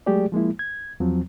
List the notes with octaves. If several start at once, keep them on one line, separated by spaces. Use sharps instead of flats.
F#3 G#3 A3 G4 G#4 D5
F3 G#3 A#3 E4
G#6
E2 F3 F#3 C4